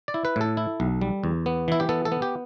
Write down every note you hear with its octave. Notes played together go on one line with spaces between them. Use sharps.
D5
E4
B4
A2 A4
E4
B1
G3
E2
B3
E3 E4
G4
B3 A4
A4
B3
G4